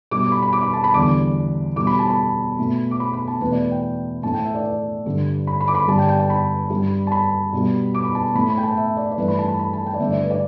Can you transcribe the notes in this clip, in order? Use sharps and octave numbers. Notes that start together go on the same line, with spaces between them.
B2 G3 D6
D6
B5
B5
D6
B5
A5
B5
E2 D3 G3 D6
B2 G3 D6
B5
A5
B5
B2 A3
D6
B5
B5
A5
E2 B2 A3 B4
D5
G5
A2 A3 A5
G5
E5
D5
D5
G2 D3 G3
B5
B5
D6
B5
G2 D3 G3 A5
G5
G5
A5
B5
G2 G3
A5
B5
B2 G3
D6
B5
A5
A2 A3 B5
B5
G5
A5
E5
D5
D5
G2 E3 A3 B4
B5
A5
B5
B5
A5
G5
D5
G2 D3 A3 E5
D5
B4
D5